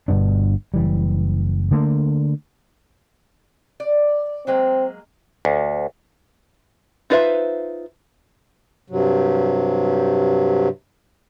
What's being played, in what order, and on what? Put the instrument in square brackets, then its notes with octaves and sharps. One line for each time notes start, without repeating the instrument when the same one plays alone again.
[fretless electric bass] G1 G2 B2 D4
F#1 E3 G3
D3 A3 A#3
[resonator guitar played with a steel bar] D5
[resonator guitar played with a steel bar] F#3 G#3 A#3 [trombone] C4
[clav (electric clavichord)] D2
[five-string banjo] D#4 F4 B4 C5 E5
[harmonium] G2 C3 F#3